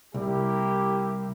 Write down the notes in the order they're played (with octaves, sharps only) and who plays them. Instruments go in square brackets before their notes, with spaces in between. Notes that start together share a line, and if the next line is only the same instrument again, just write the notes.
[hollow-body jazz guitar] C2 [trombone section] A#3 E4 G4